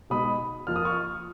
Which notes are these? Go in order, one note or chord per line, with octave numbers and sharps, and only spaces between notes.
B2 G#3 D#4 B5 D#6
F2 F3 A#3 F4 F6
D#6
C#6 F6